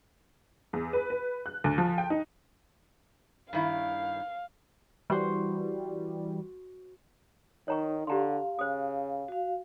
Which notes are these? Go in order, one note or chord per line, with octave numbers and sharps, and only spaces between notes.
E2
B4
B4
F#6
D2
F3
G5
D#4
G2 D#3 E4 F5
E3 G3 F#4 C5
D#3 D#4 C#5 A#5 C#6
D3 G4 F5 A#5 C6
C#3 C5 D#6
F#4 F5